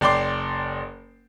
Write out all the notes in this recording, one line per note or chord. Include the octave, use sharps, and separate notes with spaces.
F#1 D5 G5 C6 D6 C7